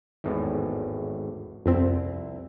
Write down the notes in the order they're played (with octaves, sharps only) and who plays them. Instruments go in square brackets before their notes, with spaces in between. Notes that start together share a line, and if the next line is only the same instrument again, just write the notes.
[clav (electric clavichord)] G#1 E2 A2
[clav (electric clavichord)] C2 E5 [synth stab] F2 C4